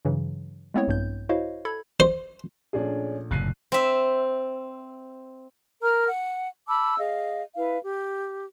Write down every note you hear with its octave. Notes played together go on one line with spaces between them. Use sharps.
G2 C#3 E3 F#3
G#3 A3 B3 C4 E4 C#5
A#1 G2 G6
E4 F#4 C5 C#5 D#5 F5
A4 B5 G#6
C5
A#1 A3 C#4 D4 G#4
F#1 A2 C3 F#6 C7 D#7
C4 E5
A#4 A#5 F6
F#5
A5 B5 D6 E6
G#4 D#5 F5
E4 B4 F5
G4